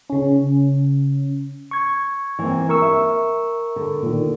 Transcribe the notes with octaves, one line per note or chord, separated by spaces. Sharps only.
C#3 C#4
C#6 G#6
E3 A#3 C4
A#4 C#6 E6
E5
D3
A#2 D#3